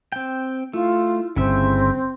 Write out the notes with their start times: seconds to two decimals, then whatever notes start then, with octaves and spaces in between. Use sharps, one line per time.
0.12 C4 G5
0.73 A3 E4 F4
1.36 G1 C#3 C4 E5